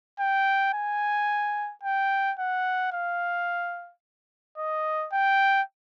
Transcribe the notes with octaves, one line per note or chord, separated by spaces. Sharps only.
G5
G#5
G5
F#5
F5
D#5
G5